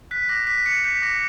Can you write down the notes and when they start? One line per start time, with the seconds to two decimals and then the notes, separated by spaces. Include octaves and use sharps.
0.11 F#6 B6
0.29 D6 A#6
0.47 D6 B6
0.65 D6 C#7
0.84 G6 B6
1.02 D6 A#6